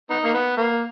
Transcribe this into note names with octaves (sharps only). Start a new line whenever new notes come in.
B3 D#4
A#3
B3
A#3